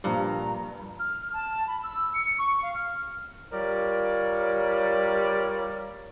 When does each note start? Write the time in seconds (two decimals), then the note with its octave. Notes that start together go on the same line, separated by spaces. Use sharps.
0.04 G2 A#2 F3 G3 A#5
1.00 F6
1.33 A5
1.67 B5
1.83 E6
2.14 C#7
2.39 C#6
2.63 F5
2.75 F6
3.51 G3 F4 A#4 C#5 D5